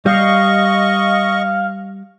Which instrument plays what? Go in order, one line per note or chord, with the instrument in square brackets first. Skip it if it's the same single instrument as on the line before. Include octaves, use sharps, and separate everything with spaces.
[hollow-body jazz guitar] G3 [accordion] D#5 C#6 [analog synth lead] F5